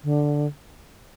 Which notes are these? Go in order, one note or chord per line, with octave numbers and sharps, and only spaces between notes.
D3